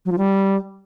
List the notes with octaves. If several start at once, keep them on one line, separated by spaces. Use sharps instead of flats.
F#3
F3
G3